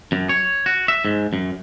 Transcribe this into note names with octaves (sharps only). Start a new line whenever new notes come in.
F#2
C#5
F#4
E5
G#2
F#2